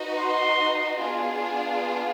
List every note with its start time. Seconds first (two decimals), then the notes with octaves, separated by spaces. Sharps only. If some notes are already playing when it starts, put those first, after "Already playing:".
Already playing: D#4 F#4 B4 D#5
0.18 C6
0.97 B3 D4 F4 G#4